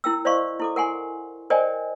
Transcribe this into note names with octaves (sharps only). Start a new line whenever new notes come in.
E4 A#4 G5 E6
C5 D5 D#5 F5 C6 C#6
E4 A4 D6
A#4 F#5 G#5 C6
A#4 C5 D5 D#5 G5 G#5